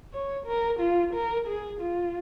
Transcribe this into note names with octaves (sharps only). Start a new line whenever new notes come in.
C#5
A#4
F4
A#4
G#4
F4